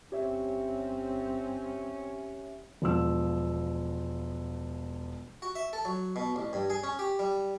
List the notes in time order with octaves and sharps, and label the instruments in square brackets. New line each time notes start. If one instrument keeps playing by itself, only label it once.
[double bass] G1 C4 [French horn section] C#4 [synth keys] G4 C#5 E5
[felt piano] E1 F3 E6
[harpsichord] F#4
E5
A4
F#3
B2
A1
G2
G#4
C#4
G4
G3